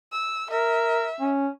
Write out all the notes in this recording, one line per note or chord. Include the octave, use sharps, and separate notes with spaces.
E6
A#4 E5
C#4